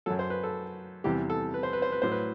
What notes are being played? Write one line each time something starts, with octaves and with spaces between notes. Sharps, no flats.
F#2 F#3 A4
C5
B4
A4
E2 C3 E3 G3 G4
A4
B4
C5
B4
C5
B4
A2 F#3 C5
B4